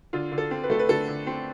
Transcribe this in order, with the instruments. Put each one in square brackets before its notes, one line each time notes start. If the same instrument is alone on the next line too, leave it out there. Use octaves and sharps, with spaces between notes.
[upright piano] D3 F4
D3
A4
C4
B4
A3 A4
B4
D3 A4
D3
C4